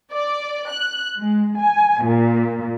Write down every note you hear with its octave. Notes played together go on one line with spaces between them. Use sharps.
D5
F#6
G#3
G#5
A#2